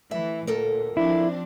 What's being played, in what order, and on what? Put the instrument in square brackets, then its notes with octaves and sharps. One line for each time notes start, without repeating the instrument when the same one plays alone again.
[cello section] E3 A3 [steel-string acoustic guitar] E5
[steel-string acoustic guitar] D2 A4 A#4 [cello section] A#2
[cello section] F3 C4 D4 [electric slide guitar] E4